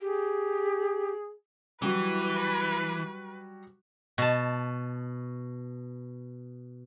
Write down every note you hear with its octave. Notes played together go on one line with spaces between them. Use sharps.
G4 G#4
E3 F#3 G3 F#4 B4
B2 A5